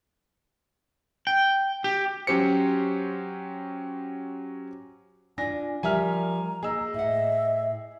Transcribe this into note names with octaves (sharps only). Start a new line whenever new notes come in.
G5
G4
F#3 C#4 G4 C5 C#7
D4 F4 G#5 A#6
F3 G3 A#4 E5 G#5 A#5 F6
A#3 G#4 D#5 E6
A2 E5 F#5